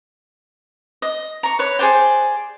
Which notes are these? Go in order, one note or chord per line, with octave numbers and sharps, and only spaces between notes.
D#5
A#5 C#6
B4 C#5
G#4 C5 D5 G5